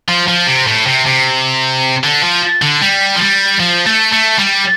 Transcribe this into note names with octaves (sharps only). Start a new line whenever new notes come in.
F3
F3
C3
A2
C3
C3
D3
F3
D3
G3
F3
G3
F3
A3
A3
G3